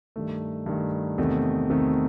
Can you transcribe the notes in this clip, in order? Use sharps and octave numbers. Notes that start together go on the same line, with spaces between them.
G2 D#3 A3
G2 D#3 A3
E2 C3 D#3 A3
E2 C3 D#3 A3